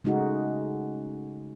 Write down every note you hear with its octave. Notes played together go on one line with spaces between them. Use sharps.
C#3 G#3 A3 D#4 F#4